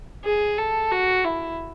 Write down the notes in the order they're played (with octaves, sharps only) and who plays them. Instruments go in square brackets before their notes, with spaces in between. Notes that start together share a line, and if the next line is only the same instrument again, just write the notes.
[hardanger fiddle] G#4
A4
F#4
E4